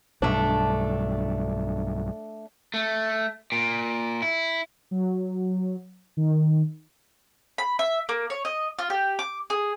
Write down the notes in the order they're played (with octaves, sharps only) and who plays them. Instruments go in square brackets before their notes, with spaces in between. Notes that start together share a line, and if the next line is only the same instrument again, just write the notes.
[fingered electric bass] B1 G2 [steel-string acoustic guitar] A3 D4
[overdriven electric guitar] A3
A#2
E4
[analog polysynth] F#3
D#3
[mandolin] B5
E5
A#3
C#5
D#5
F4
G4
D6
G#4